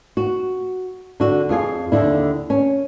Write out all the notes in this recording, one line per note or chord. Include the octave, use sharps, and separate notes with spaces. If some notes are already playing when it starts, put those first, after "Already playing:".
F#4
D3 F#4
F2 F4 G#4
D#2 D3 E4
C#4